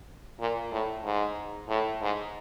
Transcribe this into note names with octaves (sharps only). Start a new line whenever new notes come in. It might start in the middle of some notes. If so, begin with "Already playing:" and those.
A#2
A2
G#2
A2
G#2